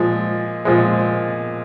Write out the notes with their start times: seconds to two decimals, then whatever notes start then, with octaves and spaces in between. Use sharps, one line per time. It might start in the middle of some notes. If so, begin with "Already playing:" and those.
Already playing: A#2 F3 G#3
0.65 A#2 F3 G#3